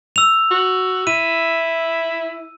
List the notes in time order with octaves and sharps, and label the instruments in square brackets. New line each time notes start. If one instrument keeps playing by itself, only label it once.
[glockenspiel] E6 F7
[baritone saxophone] F#4
[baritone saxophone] E4 [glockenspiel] D#7